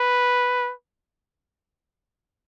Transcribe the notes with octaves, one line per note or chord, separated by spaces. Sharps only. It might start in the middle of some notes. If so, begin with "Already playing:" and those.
Already playing: B4